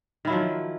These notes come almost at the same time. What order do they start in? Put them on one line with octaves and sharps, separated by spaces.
D#3 E4 F#3 F3